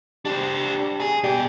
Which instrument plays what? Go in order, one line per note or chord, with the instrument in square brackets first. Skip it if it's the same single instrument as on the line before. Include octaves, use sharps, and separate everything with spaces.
[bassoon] G3 [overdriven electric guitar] D4 C5
[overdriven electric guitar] G#4
[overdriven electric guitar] B2 G5 [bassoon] G3